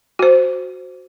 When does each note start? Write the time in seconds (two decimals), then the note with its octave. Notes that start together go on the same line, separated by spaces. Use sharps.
0.19 F#4 C5